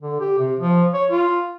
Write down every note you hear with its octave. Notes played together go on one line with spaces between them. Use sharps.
D3
G4
C3
F3
C#5
F4